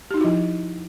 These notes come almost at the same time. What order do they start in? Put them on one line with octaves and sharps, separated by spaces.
G4 D#4 F#4 E4 F3